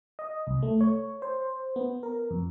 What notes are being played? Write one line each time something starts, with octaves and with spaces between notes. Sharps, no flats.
D#5
C2
A3
C#5
C5
B3
A#4
F2